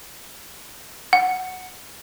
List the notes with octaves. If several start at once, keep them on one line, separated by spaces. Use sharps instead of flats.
F#5